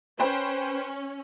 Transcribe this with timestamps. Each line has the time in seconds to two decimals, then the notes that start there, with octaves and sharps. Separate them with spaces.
0.19 C#4 B4 C5 G5